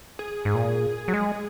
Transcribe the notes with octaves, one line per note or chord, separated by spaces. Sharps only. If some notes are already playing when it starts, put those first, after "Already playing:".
G#4
G#2
A#2
F#3
G#3